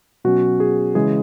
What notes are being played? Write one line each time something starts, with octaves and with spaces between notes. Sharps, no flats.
B2 F#3 C#4 F#4
G#4
C#3 E3 G#3 G#4